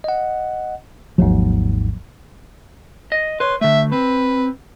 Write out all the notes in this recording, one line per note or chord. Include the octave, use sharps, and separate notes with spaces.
D#5 F#5
G#1 D#2 G#2 F3 F#3 A#3
D#5
B4 C#5 C6
D3 A3 E5
C4 B4